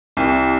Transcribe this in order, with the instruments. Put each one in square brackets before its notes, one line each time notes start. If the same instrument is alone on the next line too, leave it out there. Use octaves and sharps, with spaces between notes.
[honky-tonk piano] C2